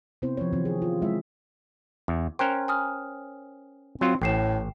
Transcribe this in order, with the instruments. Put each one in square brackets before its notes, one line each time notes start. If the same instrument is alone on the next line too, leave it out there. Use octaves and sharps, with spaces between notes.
[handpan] C3 B3 C4 E4 C5
F3 C#5
C3 D#3 E3 C4
G#4
F4
F#3 G#3 E4 E5
[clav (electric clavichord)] E2
[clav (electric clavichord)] C#4 A#4 C5 [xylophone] G5 F#6
[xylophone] G#5 D#6 F6
[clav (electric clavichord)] F#3 F4 [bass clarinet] C4
[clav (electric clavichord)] A1 [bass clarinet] A2 [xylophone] G5 C7 E7